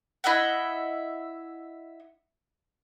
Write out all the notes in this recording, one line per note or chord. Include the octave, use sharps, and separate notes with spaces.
E4 D#5 E5 F#5